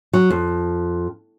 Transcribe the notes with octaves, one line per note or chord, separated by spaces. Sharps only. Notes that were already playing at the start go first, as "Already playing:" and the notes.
F#3
F2